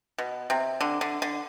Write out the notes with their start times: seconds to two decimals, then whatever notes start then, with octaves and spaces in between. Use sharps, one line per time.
0.18 B2
0.50 C3
0.81 D3
1.01 D3
1.22 D3